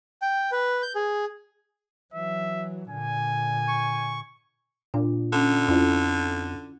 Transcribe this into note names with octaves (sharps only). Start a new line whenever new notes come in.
G5
B4
G6
G#4
E3 F#3 E5
A#2 D3 G#5
C#6
A#2 D4
D3 C#4
F2 C#4 E4 F4